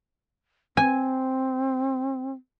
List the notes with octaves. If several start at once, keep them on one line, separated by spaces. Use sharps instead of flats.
C4 G#5